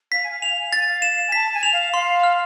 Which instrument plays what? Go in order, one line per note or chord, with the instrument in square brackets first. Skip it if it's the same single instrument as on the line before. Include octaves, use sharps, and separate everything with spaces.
[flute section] F5 [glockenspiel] B6
[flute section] G#5
F5
[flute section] G#5 [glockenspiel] F7
[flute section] F5
G#5
F5
[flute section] G#5 [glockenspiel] A6
[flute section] F5
[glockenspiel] E7
[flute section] G#5
[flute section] A5 [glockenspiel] B6
[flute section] G#5
[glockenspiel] F7
[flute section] F5
[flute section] F5 [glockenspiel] C6
[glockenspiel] F6